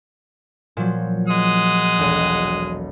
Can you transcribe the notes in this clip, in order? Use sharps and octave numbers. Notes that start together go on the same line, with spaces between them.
A#2 F3 F#3
G#3 F#5 D#6
E1 B1